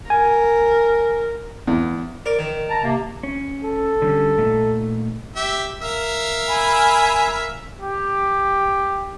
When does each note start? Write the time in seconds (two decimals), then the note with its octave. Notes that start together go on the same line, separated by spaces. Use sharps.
0.10 A#4 G#5
1.67 E2
2.26 A#4 D5
2.39 D#3
2.69 A5 A#5
2.82 C3 A#3
3.23 C#4
3.64 A4
4.02 D3 G3 C#4
4.38 A#2 A3 D#4
5.36 G4 E5
5.81 A#4 E5 F5
6.47 G#5 B5
7.81 G4